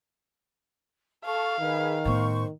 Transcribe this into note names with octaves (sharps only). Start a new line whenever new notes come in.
A4 F5 A5 C#6
D#3 G#4 B4
A2 B3 C5 C#6